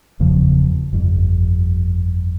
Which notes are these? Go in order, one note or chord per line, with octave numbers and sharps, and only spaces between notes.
F#1 E2 C#3 F3
G1 F2